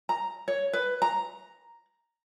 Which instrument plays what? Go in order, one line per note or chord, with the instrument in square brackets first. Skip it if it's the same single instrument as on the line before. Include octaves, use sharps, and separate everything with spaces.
[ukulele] A#5
C#5
B4
A#5